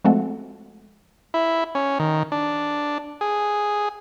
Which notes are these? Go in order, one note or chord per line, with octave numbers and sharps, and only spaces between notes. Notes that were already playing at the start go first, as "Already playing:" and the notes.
F3 G#3 A3 C4 F#4 A4
E4
C#4
D#3
D4
G#4